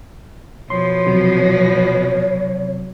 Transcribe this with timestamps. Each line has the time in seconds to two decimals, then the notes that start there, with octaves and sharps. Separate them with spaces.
0.70 B2 F3 C#5 C6
1.07 C3 F#3